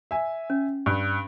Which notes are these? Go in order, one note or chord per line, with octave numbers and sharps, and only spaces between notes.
E5 G#5
C#4
G2